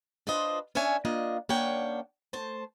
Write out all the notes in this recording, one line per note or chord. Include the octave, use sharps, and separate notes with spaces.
D4 F4 B4 C5 D#5
C#4 D4 C#5 E5 G#5
A#3 D4 F4 D#5
A#3 C#4 D4 C#5 F#5 G5
A3 C5 A5